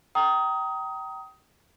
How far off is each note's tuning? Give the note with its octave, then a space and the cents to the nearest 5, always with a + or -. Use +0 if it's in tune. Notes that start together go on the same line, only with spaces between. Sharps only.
G5 -25 A#5 +0 D#6 +20